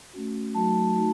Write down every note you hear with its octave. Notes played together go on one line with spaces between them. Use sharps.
A3 C#4 F#4
F#3 A3 D#4 F#4 A5
A3 D#4 F#4